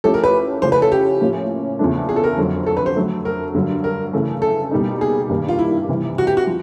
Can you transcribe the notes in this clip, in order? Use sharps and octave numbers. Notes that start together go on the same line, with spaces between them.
F3 A3 C#4 E4 G4 A4
A#4
B4
C#3 F3 A3 C#4 E4 C5
B4
A4
G4
A2 F3 A#3 C#4
E2 C#3 F3 A3 D4
G#4
A4
A#4
F2 D3 F#3
A4
B4
C5
D3 F#3 A3
A#4
G2 D3 F#3
A#4
C#3 E3 A3
A4
B2 G3 A#3 D#4
G#4
G2 D#3 G3 A#3
F4
E4
C3 E3 G3
F#4
G4
F#4
F3